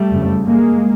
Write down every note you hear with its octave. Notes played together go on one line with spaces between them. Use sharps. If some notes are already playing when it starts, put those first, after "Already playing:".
Already playing: G3 A3
F#1 F2 C#3
G#3 A#3